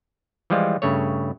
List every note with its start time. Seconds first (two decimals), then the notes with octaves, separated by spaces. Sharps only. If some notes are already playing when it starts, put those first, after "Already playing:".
0.50 E3 F3 G3 G#3 F4
0.82 G2 C#3 A3 C#5